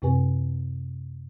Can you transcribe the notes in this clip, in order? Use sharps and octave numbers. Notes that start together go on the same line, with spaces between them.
F#2 C3 C4 G4 B4 G#5